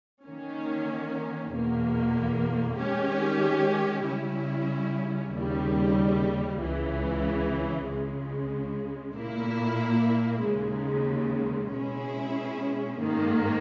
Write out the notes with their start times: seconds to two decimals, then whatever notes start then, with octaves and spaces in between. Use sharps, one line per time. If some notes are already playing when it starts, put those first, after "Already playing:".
0.24 D#3 A#3 C#4
1.52 E2 B2 A#3
2.78 D#3 G#3 C#4 G4
4.06 C#3 G3 C#4 E4
5.33 D#2 C#3 G3
6.62 C#2 C#3 E3
7.89 C#2 C#3 G#3
9.17 A#2 A#3 E4
10.45 D#2 C#3 G#3
11.72 B2 G#3 C#4 E4 G#4
13.01 G#2 D#3 A#3